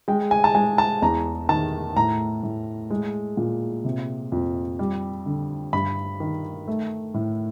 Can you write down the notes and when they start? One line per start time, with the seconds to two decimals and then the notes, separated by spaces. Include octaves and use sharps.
0.08 G#3 G5
0.31 G#5
0.44 A5
0.55 G#3 G#5
0.78 A5
1.02 E2 A#5
1.49 D#3 A5
1.96 A2 A#5
2.43 A2
2.90 G#3
3.37 A#2
3.85 C3
4.32 F2
4.79 G3
5.26 D3
5.73 G2 B5
6.20 D#3
6.68 A3
7.14 A2